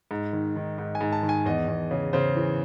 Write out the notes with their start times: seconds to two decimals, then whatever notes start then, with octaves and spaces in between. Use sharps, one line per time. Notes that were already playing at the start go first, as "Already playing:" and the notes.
0.11 G#2
0.33 D#3
0.56 D#3
0.78 G#2
0.95 G#5
1.01 G#2
1.12 A5
1.23 D#3
1.29 G#5
1.46 E2 D#5
1.68 E2
1.91 C#3
2.13 C#3 C5
2.36 E3